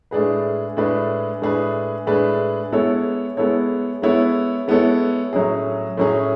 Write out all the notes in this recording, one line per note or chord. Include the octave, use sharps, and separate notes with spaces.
A2 G#3 D4 G#4 B4
A2 G#3 D4 G#4 B4
A2 G#3 D4 G#4 B4
A2 G#3 D4 G#4 B4
G#3 B3 E4 A4 C#5
G#3 B3 E4 A4 C#5
G#3 B3 E4 A4 C#5
G#3 B3 E4 A4 C#5
A2 F#3 C#4 G#4
A2 F#3 C#4 G#4